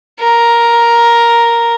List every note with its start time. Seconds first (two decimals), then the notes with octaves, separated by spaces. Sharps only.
0.19 A#4